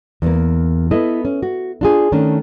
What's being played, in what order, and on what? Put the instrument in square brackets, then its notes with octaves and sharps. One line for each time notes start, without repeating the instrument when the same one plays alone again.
[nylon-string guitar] E2 A#3
B3 E4 A4 D#5
C#4
F#4
D4 F4 G#4
D#3 A3 C#4 D4